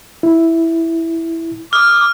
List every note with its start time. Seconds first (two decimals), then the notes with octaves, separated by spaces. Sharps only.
0.23 E4
1.73 D6 D#6 F6